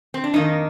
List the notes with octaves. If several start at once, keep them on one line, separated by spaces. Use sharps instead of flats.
C4
D4
F2 D#3 A#3 D#4